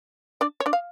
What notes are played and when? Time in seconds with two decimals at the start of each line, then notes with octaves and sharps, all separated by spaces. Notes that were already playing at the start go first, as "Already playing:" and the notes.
0.41 D4 D5
0.60 C#5
0.66 D4 D5
0.73 F5